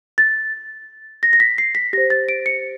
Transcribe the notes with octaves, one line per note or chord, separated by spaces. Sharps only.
A6
A#6
A#6
B6
C7
B6
G4 C5 A#6
A6
D7
C#7